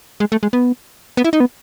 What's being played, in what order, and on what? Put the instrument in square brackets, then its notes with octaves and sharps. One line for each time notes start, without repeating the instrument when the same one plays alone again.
[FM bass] G#3
A3
G#3
B3
B3
E4
D#4
B3